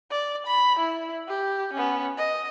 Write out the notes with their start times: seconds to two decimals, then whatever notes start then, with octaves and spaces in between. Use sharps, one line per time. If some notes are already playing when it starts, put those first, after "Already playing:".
0.11 D5
0.46 B5
0.79 E4
1.28 G4
1.73 B3 C#4
2.18 D#5